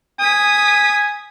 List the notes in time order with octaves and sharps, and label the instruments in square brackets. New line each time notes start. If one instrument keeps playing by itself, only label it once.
[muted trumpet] G#5 [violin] D#6 B6